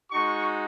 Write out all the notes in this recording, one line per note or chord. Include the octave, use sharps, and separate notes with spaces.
G#3 D#4 F#4 C#6